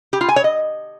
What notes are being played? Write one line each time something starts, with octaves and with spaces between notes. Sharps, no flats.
G4
F4
G#5
C#5
D#5